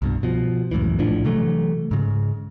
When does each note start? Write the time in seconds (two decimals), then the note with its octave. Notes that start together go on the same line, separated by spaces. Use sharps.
0.02 C2 G2 B2
0.23 B2 F3
0.71 C#2 F#2 A2 E3
0.99 A#1 A2 F3 D4
1.25 C3 E3 F#3 A3
1.91 G#2 C#3